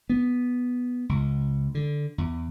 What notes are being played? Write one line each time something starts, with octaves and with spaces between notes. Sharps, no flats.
B3
C#2
D3
E2